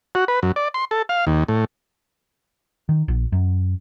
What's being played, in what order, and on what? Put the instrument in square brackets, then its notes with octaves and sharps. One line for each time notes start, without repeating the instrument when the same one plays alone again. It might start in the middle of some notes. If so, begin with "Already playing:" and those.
[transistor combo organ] F#4
B4
F#2
D5
C6
A4
F5
D#2
A2
[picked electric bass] D#3
A#1
F#2